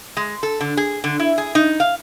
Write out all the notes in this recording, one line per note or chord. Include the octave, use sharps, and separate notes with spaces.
G#3
A4
D3
G#4
D3
E4
G#4
D#4
F5